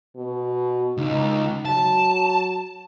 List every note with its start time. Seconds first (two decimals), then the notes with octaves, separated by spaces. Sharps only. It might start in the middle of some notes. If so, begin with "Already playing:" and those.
0.16 B2
0.98 C#2 D#4
1.65 F#3 A5